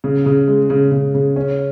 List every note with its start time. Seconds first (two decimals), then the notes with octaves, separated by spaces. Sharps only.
0.04 C#3
0.26 C#3
0.48 G#3
0.70 C#3
0.91 C#3
1.15 C#3
1.36 C#4